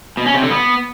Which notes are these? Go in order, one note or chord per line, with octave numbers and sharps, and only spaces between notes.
B2
C#4
C3
D3
B3